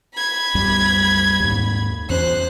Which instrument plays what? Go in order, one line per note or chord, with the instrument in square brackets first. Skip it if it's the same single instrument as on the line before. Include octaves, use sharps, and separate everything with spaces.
[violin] B5 G#6
[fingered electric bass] C2 F#2 G3
D#2 G#2
[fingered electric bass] E2 C#4 [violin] C5 F#6